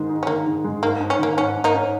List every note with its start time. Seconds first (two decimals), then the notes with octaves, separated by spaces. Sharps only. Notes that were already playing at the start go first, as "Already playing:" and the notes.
Already playing: G#2 D#3 G#3
0.09 D#4
0.23 C#4
0.27 D#3 A#3
0.46 D#3
0.64 G#3
0.83 G#2 A#3
1.00 G#2
1.10 C#4
1.19 D#3 A#3
1.37 G#2 C#4
1.55 G#2
1.64 A#3 D#4
1.74 C#4